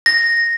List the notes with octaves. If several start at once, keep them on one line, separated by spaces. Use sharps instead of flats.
A#6